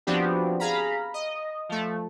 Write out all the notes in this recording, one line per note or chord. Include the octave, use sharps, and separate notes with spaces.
F3 B3 C4 D4 F#4 G4
G#4 F5 A#5 B5
D#5
F3 A3